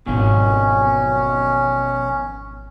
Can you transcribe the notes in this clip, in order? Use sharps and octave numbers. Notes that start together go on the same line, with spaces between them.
G#1 F2 B2 D#3 F#3 C#4